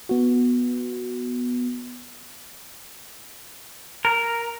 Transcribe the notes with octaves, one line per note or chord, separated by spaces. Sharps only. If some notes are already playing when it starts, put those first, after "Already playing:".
B3 F#4
A#4